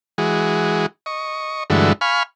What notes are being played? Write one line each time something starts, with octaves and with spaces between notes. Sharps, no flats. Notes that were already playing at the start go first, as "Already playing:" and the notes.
E3 G#3 F#4 G#4
D#5 C#6
G2 D3 E3 G#3 A3 F#4
F5 G#5 B5 C#6 F6